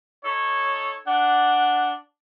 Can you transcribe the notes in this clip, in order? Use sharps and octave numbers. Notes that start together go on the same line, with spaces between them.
D#4 A4 C#5
D4 F#5